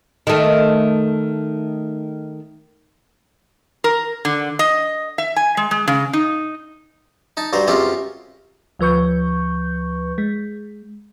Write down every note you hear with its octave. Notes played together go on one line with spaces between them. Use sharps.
D#3 A3
A#4
D3
D#5
E5
G#5
G#3
G#3
C#3
D#4
D#4 A5
G2 F#3 C5 A#5
F#2 G#3 C4 C#4 F4 G4
D2 F3 B4 C#6 G6
G#3